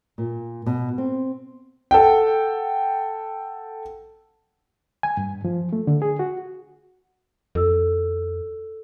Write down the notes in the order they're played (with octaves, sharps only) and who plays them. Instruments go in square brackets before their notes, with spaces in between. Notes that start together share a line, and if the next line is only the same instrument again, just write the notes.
[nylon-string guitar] A#2
B2
C4
[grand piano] A4 F#5 G5
[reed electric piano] G#5
G2
F3
A3
D3
G#4
F#4
[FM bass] F2 [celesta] A4 E6